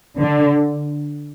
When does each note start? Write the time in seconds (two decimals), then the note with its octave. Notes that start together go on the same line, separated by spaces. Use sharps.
0.18 D3